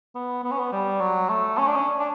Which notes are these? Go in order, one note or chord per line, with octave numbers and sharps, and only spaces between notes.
B3
B3
C#4
B3
G3
F#3
A3
C#4
D4
C#4
D4